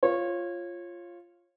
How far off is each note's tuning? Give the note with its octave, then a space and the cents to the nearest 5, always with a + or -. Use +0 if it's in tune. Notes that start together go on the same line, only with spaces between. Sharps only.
F4 -5 C#5 -25